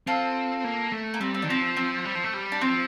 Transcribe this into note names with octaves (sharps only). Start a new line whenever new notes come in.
C4 F4 A4
A#3
A3
A#3
G3 C4
C4
D#3 D4
F3 C4
C4
G3
F3
A3
G3
D4
F3 C4